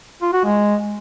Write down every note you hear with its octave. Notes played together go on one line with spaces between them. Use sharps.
F4
F#4
G#3